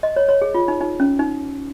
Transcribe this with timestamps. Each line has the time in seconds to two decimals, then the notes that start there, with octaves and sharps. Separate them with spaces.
0.03 D#5
0.16 C#5
0.29 C#5
0.41 G#4
0.54 F4
0.68 D#4
0.81 D#4
1.00 C#4
1.19 D#4